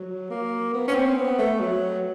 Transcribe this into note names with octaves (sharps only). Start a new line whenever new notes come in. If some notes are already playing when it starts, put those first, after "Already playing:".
Already playing: F#3
A#3
B3
C#4
C4
B3
A3
F#3